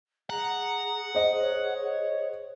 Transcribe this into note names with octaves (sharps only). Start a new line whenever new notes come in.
G#4 F#5 A#5
C5 D#5
C#5